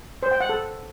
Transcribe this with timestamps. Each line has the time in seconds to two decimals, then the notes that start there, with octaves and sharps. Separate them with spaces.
0.23 C5
0.31 G5
0.40 F#5
0.49 A4